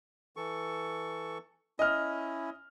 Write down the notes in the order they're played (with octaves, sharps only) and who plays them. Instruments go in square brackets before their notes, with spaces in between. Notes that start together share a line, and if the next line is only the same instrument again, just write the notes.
[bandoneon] E3 A4 C#6
[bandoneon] C#4 E4 [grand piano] D#5 F6